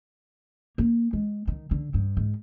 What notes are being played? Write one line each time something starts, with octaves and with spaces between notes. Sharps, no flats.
A#3
G#3
D#3
D3
G2
G#2